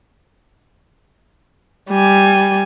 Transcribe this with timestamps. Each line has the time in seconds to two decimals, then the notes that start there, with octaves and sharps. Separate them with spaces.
1.90 G3 G#5